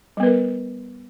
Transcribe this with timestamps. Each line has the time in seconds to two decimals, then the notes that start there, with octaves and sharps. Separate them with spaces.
0.17 G3
0.20 B3
0.23 B4
0.26 A#4